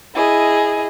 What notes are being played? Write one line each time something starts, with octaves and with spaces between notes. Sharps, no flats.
E4 G#4 D#5